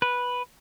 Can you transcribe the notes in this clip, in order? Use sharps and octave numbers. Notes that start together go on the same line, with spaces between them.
B4